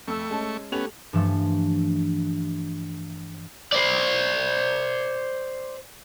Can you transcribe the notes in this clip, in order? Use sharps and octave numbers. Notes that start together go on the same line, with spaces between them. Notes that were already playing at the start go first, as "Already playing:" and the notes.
F2 A3 C#6 E6
G#3 C#4 A5
A3 B3 C#4 G4 F7
G2 E3 F3 A3
C5 D5